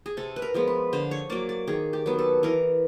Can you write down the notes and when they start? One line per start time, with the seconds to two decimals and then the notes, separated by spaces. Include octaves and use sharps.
0.06 G#4
0.17 C3 A4
0.36 B4
0.42 A#4
0.54 F3 G#3 B3
0.67 B4
0.93 D3 C5
1.11 C#5
1.30 F#3 A#3 D5
1.49 D5
1.67 D#3 G#4
1.93 G4
2.06 F#3 B3
2.19 A4
2.43 E3 A#4